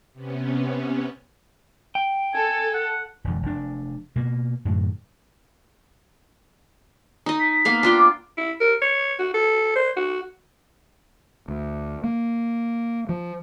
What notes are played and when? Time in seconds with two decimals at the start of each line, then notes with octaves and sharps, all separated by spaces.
0.13 C3 B3 C#4
1.95 G5
2.34 A4 G#5
2.74 F#5
3.24 E1 F2 D3
3.42 F1 D4
4.16 B2 A#3
4.65 F#2 A2 D3 F#3
7.26 D#4 D#5
7.40 B6
7.65 A#3 B3 F5
7.83 D4 F4 G5
7.98 D6
8.38 E4
8.61 A#4
8.82 C#5
9.20 F#4
9.34 A4
9.76 C5
9.97 F#4
11.48 D2
12.04 A#3
13.09 F3